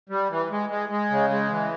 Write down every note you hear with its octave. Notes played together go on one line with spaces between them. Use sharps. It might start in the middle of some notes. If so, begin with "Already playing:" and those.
G3
E3
G#3
G#3
G#3
C#3
G#3
E3